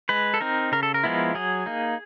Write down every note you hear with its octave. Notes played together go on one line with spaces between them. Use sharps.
G#3 B4
A4
C4 D#4 A#4
C#3 A#4
A4
A#4
F3 G#3 B3 E4
F#3 G#4
A#3 D#4